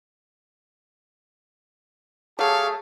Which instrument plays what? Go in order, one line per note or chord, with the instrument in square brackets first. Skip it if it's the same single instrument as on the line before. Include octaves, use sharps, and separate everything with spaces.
[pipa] F#3 A3 [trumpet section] G4 C#5 F5 [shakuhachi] G#4 [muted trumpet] A5